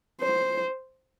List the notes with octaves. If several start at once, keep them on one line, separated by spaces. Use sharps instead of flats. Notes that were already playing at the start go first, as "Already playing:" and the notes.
C5